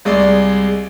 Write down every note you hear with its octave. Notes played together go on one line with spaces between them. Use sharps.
C2 G#3 D5